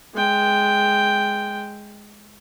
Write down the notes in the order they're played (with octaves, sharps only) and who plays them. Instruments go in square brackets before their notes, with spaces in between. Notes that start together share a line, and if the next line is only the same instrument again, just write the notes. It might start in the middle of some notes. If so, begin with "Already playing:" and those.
[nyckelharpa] G#3 G5